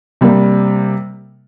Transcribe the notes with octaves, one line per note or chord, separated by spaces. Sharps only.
C3 G3 A#3